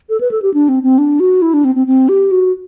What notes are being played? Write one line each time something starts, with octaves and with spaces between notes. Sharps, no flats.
A4
B4
A4
G4
D4
C4
C4
D4
F#4
E4
D4
C4
C4
C4
G4
F#4